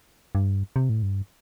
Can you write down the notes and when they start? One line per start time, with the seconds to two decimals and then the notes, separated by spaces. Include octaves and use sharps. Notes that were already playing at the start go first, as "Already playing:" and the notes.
0.35 G2
0.76 C3
0.89 A2
1.03 G2